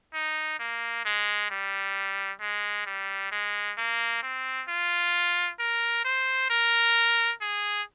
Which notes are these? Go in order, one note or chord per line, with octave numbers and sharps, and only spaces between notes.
D#4
A#3
G#3
G3
G#3
G3
G#3
A#3
C4
F4
A#4
C5
A#4
G#4